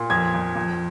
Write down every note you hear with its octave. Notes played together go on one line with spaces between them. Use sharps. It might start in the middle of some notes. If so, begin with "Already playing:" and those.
Already playing: A#2
F2 G#6
F2
F2